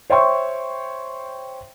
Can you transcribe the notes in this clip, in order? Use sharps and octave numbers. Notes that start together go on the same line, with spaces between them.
C5 C#5 E5 G5 C6 C#6